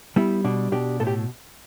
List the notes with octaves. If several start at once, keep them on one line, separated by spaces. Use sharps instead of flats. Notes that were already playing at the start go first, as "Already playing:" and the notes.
G3 B3 E4
B2 D4
B2 D4 G4
A2 A4
G4